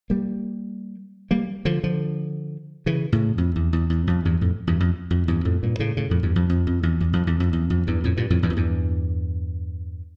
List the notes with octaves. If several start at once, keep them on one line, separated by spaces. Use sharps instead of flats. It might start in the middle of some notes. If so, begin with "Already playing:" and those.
G3 A#3
G3 A#3
D3 F3
D3 F3
C#3 E3
A2 C#3
F2
E2
E2
E2
F2
E2 G2
F2 A2
E2 G2
F2
F2
E2 G2
F2 A2
G2 A#2
A2 C#3
A2 C#3
F2 A2
E2 G2
F2
F2
F2
E2
E2
F2
E2
F2
E2
F2
E2 G2
F2 A2
G2 A#2
F2 A2
E2 G2
F2
E2 G2